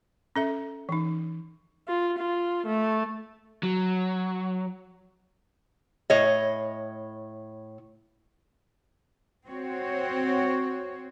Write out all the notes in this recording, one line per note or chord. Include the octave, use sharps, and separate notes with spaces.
C#4 A4 E5
E3 D#4
F4
F4
A3
F#3
A2 C#5 D#5
C4 F#4 C#5